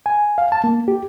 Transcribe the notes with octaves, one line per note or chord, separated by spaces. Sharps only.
G#5
F5
A5
A#3
G4